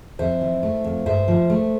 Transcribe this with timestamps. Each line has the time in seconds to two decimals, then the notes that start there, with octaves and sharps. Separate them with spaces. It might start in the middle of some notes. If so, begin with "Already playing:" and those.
0.19 F2 C5 E5
0.41 E3
0.63 A3
0.84 F2
1.06 G2 C5 E5
1.28 F3
1.50 A3